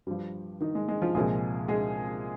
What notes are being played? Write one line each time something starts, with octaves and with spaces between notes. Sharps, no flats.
G2 F3 G3
D#3 D#4
G#3
G#3
F3 F4
C2 A#2 F3 G#3 G#4
G#3 G#4